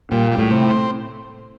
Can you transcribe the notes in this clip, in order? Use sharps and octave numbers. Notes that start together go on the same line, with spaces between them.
A#2 G3
G3
A2
C3
C4